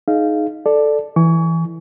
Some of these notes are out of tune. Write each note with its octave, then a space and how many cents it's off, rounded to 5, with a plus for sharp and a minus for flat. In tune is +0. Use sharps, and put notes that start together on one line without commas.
D#4 +0 G#4 +25 F5 -15
A4 +0 D5 +10
E3 +0 G#5 +0 C#6 +35